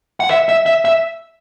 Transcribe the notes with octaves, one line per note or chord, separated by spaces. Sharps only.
F#5
E5
E5
E5
E5